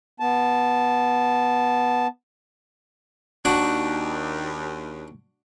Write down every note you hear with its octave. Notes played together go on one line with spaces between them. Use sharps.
B3 A5
D#2 D4 F#4 F#5